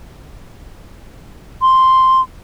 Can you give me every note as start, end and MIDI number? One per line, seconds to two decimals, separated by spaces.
1.62 2.21 84